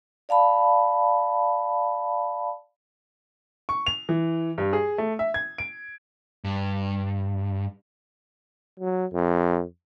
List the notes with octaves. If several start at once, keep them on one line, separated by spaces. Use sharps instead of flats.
D5 F5 A5 B5
C#6
F7
E3
G2
G#4
A3
E5
G#6
D7
G2
F#3
F2